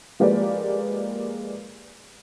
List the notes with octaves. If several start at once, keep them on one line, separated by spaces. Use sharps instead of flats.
F3 G#3 A#3 G4 B4 D5